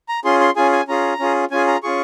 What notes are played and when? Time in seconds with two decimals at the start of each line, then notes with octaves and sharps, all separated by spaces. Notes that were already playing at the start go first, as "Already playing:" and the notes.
0.09 A#5
0.25 C#4 F4 G#4 C6
0.40 C6
0.56 C#4 F4 G#4 G#5
0.72 G#5
0.88 C#4 F4 G#4 A#5
1.19 C#4 F4 G#4
1.51 C#4 F4 G#4 G#5
1.67 A#5
1.83 C#4 F4 G#4 C#6